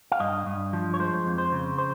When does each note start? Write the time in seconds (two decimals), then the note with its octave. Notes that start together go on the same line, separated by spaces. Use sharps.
0.12 F5
0.20 G2 D#5
0.46 G2
0.73 F3
0.94 C#5
0.99 G#3 C5
1.26 F2
1.38 C5
1.52 C#3
1.78 C5